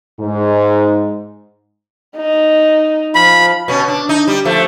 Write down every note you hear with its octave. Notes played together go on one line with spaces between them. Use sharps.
G#2
D#4
F3 B5
B2 C#4
D4
D#4
G3
F3 A3